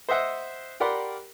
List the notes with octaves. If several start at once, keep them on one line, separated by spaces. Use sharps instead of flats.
C5 D#5 E5 F#5
G4 A#4 D5 F#5 B5 C6